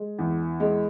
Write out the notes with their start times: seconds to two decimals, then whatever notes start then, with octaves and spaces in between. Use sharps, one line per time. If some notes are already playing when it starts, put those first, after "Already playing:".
Already playing: G#3
0.19 E2
0.60 G#3